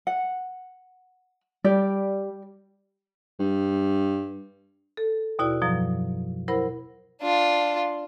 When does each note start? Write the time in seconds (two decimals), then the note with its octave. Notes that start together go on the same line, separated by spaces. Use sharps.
0.07 F#5
1.64 G3 G4 D5
3.39 G2
4.97 A4
5.39 D#2 B2 E4 F#4 D5
5.62 F#2 B2 F3 F#3
6.48 E4 A#4 C5 F#5 B5
7.21 D4 F4